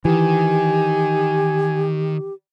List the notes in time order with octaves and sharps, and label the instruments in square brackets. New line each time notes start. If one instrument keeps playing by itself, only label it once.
[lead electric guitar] D#3 [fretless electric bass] E3 [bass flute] G4 [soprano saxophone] G#5